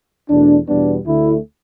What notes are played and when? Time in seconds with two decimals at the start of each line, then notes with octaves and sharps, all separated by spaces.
0.29 E2 B2 A3 D4
0.68 E2 B2 G3 B3 D4
1.06 D2 D3 A3 E4